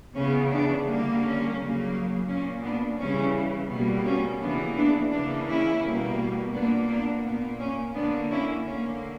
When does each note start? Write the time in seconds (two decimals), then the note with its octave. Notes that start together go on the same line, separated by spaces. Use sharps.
0.14 C#3 E3 B3 C#4
0.50 B3 D4
0.85 D3 G3 A#3
1.21 C#4
1.57 C#3 F#3 A#3
2.28 A#2 A#3 C#4
2.62 B3 D4
2.99 C#3 E3 G3 C#4
3.69 B2 G3 A#3 B3
4.05 C#4
4.40 C#3 E3 A#3 B3 D4
4.75 B3 D4
5.11 C#3 E3 A#3 B3 D4
5.46 C#4 E4
5.82 B2 G3 A#3
6.53 A#2 A#3 B3 D4
6.89 B3 D4
7.24 A#2 A#3 B3
7.59 C#4
7.94 D3 A#3 B3 D4
8.30 C#4 E4
8.66 D3 A#3 C#4